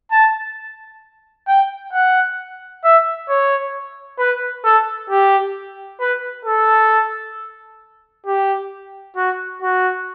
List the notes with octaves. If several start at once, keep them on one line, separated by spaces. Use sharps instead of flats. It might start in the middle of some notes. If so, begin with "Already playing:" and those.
A5
G5
F#5
E5
C#5
B4
A4
G4
B4
A4
G4
F#4
F#4